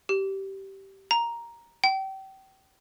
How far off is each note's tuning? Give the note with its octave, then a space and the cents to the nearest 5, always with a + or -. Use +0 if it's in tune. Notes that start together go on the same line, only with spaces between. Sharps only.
G4 -15
A#5 +5
G5 -30